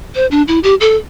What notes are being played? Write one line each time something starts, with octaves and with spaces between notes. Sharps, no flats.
C5
D4
E4
G4
A4